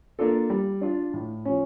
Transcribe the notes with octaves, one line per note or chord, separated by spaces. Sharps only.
A#3 D4 F4 A4
G3
D4 F4
A2
F3 C#4